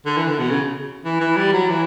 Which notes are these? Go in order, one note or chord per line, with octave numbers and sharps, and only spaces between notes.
D3
E3
D3
B2
C#3
E3
E3
G3
F#3
E3